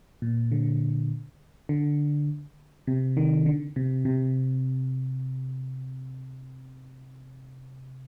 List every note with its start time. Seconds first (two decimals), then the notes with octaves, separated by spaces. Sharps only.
0.22 A#2
0.52 D3
1.69 D3
2.87 C3
3.17 D#3
3.46 D3
3.76 C3
4.05 C3